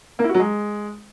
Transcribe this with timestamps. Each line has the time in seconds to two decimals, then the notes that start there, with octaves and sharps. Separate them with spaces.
0.19 A#3
0.24 E4
0.29 F#4
0.34 F#3
0.40 G#3